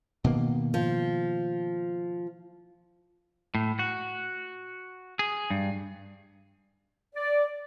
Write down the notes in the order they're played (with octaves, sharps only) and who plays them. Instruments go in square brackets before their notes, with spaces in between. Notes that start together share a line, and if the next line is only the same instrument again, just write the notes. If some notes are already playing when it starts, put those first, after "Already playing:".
[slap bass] B2 D#3 A#3
[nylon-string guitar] F3
[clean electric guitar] A2
F#4
G#4
G2
[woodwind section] D5